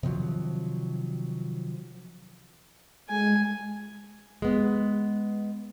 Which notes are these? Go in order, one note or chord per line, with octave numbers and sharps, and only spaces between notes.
C3 D#3 F3 F#3
G#3 G#5
G#3 B3